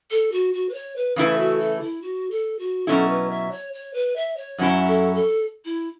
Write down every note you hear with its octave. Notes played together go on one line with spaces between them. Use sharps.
A4
F#4
F#4
B4
C#5
B4
C#3 E3 A3 E4 B4
F#4
A4
E4
F#4
A4
F#4
B2 F#3 C#4 E4 A4
B4
E5
C#5
C#5
B4
E5
C#5
F#2 F#3 C#4 E4
A4
A4
E4